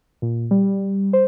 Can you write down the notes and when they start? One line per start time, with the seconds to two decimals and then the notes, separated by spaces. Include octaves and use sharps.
0.22 A#2
0.51 G3
1.13 C5